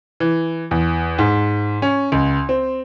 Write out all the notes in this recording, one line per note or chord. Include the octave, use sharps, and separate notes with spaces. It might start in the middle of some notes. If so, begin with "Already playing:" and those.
E3
E2
G#2
C#4
C#2
C4